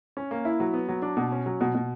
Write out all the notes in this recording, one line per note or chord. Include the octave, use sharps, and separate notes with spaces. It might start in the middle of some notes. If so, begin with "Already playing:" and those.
C#4
A#3
E4
F#3
B3
F#3
D4
B2
C#4
F#3
B2
B2